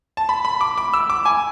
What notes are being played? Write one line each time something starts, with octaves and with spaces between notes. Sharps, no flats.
A5
B5
B5
D6
D6
E6
D6
G#5